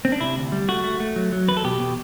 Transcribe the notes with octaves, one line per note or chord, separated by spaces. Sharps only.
C4
D4
C3 E4
D2
G3
A3 F#4
A3
A3
F#3
F#3
E2 B4
A4
B2 G4
B2